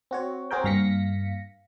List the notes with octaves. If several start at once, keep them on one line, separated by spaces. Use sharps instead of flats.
C4 F#4 C#5
C4 F#4 G#4 A#4 G5
G2 A#3 F5 A#6 B6 C#7